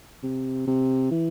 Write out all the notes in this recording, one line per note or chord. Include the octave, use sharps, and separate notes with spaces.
C3
C3
E3